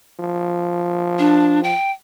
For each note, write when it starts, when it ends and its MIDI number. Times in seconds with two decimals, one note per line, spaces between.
0.19 1.73 53
1.19 1.60 62
1.64 1.90 79